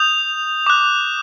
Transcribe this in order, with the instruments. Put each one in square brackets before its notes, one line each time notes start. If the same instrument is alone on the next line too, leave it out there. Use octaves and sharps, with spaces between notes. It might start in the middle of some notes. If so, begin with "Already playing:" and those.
Already playing: [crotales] D#6 G6 F7
D6 F#6